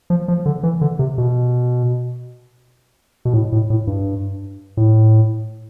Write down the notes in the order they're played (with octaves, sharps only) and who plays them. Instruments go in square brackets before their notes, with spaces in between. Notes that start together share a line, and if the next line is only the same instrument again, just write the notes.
[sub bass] F3
F3
D3
E3
D3
C3
B2
B2
A2
A2
A2
G2
A2